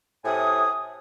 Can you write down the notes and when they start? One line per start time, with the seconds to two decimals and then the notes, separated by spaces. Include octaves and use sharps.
0.24 A2 C3 G#5 D#6